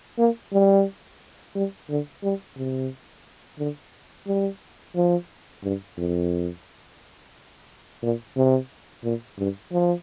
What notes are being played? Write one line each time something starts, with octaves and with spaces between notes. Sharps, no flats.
A#3
G3
G3
D3
G3
C3
D3
G3
F3
G2
F2
A#2
C3
A#2
G2
F3